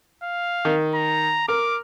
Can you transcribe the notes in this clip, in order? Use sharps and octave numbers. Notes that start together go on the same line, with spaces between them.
F5
D#3
A#5
A#4 D6